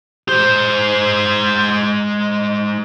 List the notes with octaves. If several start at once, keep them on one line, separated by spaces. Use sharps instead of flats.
G#3 C5